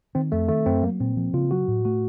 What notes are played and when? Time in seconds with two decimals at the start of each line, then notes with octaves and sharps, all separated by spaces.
0.15 D#3 C4
0.32 F2 A3
0.49 D#3 A3
0.66 F#2 C4
0.83 F#3 A#3
1.00 A#2 C4
1.17 F3
1.33 C#3 F4
1.51 F#3 F#4
1.68 A2
1.85 A3 F#4